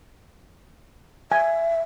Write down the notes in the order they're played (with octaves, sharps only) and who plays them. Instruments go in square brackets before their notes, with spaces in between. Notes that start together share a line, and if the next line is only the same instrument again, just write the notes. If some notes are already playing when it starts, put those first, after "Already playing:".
[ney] E5 [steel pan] G#5